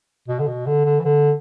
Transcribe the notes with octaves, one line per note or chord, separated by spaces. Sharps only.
B2
D3
B2
D3
D3
E3
D3